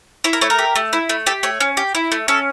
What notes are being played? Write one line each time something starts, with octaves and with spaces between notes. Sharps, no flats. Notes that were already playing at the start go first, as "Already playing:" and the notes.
E4 C#5
A#4
A3 C#5
A#4
G4
A3
E4
A3
G4 A4
A3 C#5
C#4
G4
E4
A3
C#4 A4